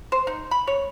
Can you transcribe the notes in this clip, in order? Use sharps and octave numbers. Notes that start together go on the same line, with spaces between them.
C5
D#4
B5
C#5